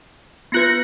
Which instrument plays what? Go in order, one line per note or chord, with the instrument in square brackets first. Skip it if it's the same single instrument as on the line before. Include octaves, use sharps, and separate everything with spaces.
[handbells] B3 F4 B4 [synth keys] F#6 A#6 C#7